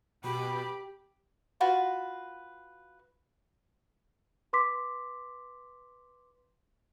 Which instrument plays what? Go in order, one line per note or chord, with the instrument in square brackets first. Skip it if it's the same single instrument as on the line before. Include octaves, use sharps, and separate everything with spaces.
[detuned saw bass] B2 [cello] G4 [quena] B5
[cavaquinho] F4 F#4 B4
[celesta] B4 C6 D6 B6